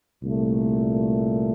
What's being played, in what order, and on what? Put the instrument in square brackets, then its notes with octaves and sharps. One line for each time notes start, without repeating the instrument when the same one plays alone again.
[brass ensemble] C2 A#2 A3